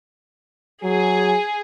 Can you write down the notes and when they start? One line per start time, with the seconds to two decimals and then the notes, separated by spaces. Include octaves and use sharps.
0.84 F#3 G#4 G#5